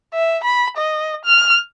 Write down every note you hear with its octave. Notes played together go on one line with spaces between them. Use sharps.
E5
B5
D#5
F6